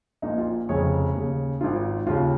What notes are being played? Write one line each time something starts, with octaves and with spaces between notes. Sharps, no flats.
A#1 A#2 D#4
F4
F1 F2 C#3 G#4 C#5
D#2 C#3
G#1 G#2 D#3 F4
D#2 C#3 F4